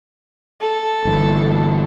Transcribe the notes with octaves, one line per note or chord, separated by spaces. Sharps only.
A4
G1 E3